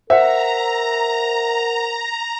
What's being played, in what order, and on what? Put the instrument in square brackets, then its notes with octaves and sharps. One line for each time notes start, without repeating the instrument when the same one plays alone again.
[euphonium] A#4 [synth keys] C5 F#5 [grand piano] E5 [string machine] A#5